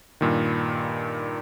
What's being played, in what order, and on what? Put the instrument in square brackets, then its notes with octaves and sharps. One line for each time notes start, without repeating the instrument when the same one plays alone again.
[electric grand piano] G2 A#2 D#3